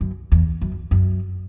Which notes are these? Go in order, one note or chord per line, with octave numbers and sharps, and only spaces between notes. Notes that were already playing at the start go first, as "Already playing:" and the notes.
F#2
E2
F#2
F#2